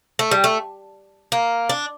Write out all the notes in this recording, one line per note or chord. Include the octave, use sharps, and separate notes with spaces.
A3
G3
A3
A#3
D4